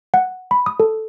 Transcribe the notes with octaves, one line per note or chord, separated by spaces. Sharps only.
F#5
B5
D#6
A4